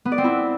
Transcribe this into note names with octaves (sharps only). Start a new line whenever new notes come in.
B3
D5
C4
E4